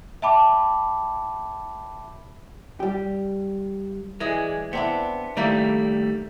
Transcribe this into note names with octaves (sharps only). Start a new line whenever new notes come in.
E5 G5 A5 B5 D6
G3 G4
E3 G#3 G#4 D5
B3 C4 D4 E4
D#3 G3 A3 A#3 E4 D5